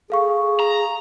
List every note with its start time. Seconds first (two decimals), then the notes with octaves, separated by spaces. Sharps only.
0.10 G#4 A4 F5 C#6
0.60 A#5